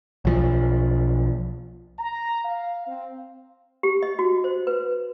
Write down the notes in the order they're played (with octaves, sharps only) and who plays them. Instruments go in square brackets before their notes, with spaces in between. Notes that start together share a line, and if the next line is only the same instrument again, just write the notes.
[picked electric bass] B1 F3
[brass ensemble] A#5
F5
C4
[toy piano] G4
D#5
F#4
C5
B4